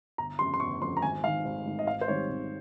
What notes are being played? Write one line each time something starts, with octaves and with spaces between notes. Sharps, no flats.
G1 A#5
F2 C#3 C6
C6
G1 C#6
F2 C#3 C6
A#5
G#1 G#5
G#2 D#3 F5
G#1
G#2 D#3
D#5
G#1 F5
C5
G#2 D#3 G3 C4 C#5
G#1